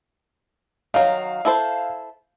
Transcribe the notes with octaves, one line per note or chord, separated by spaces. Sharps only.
D#3 F#3 F5
E4 A4 C5